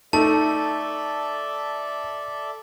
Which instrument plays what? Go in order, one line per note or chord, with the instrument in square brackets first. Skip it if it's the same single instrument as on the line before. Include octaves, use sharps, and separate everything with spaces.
[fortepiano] A3 [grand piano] D#4 [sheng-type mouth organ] A4 D5 E5 [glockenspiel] A5